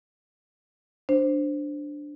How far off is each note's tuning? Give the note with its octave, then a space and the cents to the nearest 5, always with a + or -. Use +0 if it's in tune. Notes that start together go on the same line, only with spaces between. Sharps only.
D4 +0 C5 +0